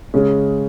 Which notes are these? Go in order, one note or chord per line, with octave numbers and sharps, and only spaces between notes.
C#3 G#3 C#4